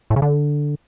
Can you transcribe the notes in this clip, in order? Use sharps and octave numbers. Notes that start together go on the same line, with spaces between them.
A2
C#3
D3